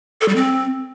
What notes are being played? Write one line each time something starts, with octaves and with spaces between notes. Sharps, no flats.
A4
G3
C4